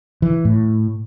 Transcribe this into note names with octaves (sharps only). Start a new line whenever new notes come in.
E3
A2